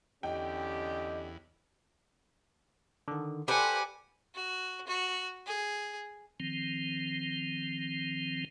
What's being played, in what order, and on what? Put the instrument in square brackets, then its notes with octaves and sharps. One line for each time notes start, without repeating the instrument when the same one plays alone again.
[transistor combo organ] E2 [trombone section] D3 C#4 G4 [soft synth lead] D#5 [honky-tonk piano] G5
[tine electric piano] D3 D#3
[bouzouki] G4 B4 C5 [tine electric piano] A4 [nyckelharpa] D5 F#5 [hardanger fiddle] G#5 D6
[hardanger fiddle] F#4
F#4
G#4
[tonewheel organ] D#3 F3 C4